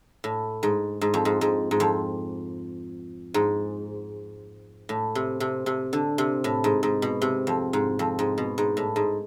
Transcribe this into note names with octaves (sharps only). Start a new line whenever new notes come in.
A2
G#2
G#2
F2
G#2
G#2
G#2
F2
G#2
A2
C3
C3
C3
D3
C3
A2
G#2
G#2
B2
C3
F2
G#2
F2
G#2
B2
G#2
A2
G#2